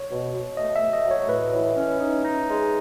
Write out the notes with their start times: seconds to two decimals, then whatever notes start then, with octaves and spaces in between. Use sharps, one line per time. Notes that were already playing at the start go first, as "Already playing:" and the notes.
Already playing: C#5
0.10 B2
0.34 B2
0.57 A3 D#5
0.76 E5
0.81 A3
0.93 D#5
1.05 F#3
1.11 C#5
1.29 A2 B4
1.53 E3
1.76 C#4
2.00 D#4
2.24 D#4
2.48 G#3